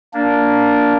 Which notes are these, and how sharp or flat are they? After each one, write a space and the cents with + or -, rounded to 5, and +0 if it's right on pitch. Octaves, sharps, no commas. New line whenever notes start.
A#3 +0 D4 -10